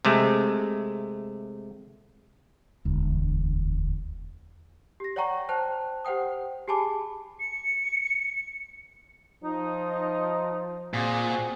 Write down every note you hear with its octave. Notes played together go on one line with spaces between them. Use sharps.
C3 G#3 A3
E1 D2
G4 A#6
C#5 D5 F#5 G5 A#5 C#6
C5 G5 A5 F#6
G4 C5 F#5 G5 D#6
G4 G#4 G#5 A5 B5 D6
C#7
F3 D#4
A#2 C4 F#4 G#4